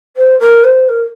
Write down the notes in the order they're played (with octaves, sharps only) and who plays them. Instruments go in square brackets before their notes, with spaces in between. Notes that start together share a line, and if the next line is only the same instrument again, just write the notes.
[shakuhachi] C5
A#4
C5
A#4